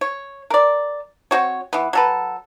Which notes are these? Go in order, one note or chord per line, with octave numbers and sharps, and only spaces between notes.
C#5
A#4 D5
C4 F#4 C#5
E3 B3
F#3 A4 B4